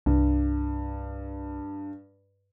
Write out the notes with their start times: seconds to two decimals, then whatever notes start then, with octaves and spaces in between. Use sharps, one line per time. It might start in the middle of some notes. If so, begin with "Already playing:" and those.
0.06 C2 G2